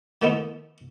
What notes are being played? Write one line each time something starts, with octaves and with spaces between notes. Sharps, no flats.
D#3 F3 A3 B3 D#4 E4